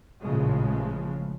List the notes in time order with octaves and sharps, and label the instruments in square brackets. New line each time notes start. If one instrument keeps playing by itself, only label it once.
[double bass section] A1 A#2 C#3 F3 G#3